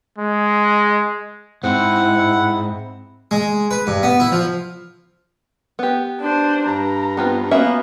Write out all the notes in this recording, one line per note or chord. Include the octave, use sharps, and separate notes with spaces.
G#3
G#2 C4 E4 F#5
G#3
B4
G2
B3
E4
F3
B3 G4
D4 C5
G2 A#5
B3 C4 F4
A#3 B3 C#4 F#4 E5